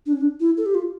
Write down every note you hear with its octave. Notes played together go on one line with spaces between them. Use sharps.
D4
C#4
D4
E4
A4
G4
F4